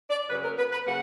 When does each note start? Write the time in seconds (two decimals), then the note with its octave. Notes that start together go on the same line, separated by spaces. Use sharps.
0.10 D5
0.29 F#2 C#3 F#3 B4
0.44 A#4
0.58 B4
0.72 B4
0.86 C#3 F#3 A#3 F#5